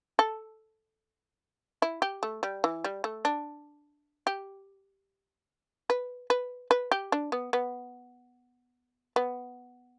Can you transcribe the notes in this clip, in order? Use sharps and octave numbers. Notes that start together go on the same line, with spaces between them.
A4
E4
G4
A3
G3
E3
G3
A3
D4
G4
B4
B4
B4
G4
D4
B3
B3
B3